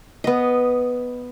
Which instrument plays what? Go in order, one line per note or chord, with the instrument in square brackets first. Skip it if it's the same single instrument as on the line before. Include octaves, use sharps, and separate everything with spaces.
[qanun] B3 D#5